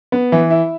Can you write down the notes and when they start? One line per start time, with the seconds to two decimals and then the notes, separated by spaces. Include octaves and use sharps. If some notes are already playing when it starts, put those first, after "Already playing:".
0.12 B3
0.32 E3
0.50 E4